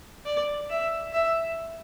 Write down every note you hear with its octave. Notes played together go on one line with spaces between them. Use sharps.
D5
E5
E5